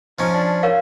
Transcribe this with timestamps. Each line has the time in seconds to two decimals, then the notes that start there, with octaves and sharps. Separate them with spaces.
0.19 F3 C#4 D#4
0.34 D4
0.63 F4 A#4 C#5 F5